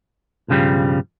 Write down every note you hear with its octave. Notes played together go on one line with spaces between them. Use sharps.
B1 G2 C#3 F3 G3